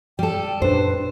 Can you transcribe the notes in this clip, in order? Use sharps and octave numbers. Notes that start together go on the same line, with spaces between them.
G3 A4 G5
F#2 A#2 D4 B4 C5